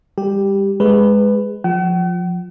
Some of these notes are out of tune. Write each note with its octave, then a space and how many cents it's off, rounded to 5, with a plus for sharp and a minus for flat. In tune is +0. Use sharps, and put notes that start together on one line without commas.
G3 +30 G4 +0
G#3 +0 G#4 -30 B4 +10
F3 +15 F#5 +45